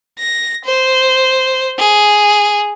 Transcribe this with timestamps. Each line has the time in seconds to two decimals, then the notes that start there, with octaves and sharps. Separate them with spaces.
0.19 A#6
0.65 C5
1.78 G#4